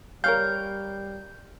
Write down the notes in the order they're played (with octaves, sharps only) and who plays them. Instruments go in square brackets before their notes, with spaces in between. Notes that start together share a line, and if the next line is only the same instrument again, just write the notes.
[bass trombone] G3 [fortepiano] A#4 C#5 F5 [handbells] G6